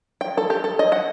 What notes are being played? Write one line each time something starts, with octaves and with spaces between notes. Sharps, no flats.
G5
A4
G4
A4
D#5
F#5